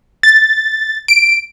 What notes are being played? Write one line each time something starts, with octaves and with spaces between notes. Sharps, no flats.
A6
D7